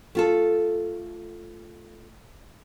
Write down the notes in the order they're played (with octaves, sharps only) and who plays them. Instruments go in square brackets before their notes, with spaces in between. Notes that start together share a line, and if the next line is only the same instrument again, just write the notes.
[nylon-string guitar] A3 F4 A4